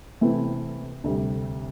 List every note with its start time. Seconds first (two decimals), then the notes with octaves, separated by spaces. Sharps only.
0.21 C3 E3 A3 C4 E4
1.04 D2 C3 G3